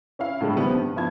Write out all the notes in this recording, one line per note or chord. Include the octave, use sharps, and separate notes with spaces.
C#4 E4 F5
A2 D3 G3 G#3 B3
D#3 F3 G3 B3
G2
F2 B3 E4 F4 A5 G#6